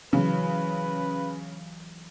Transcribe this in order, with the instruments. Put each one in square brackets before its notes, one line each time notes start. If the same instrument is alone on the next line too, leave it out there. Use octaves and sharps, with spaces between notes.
[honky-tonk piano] C#3 [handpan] E3 F#3 [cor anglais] B4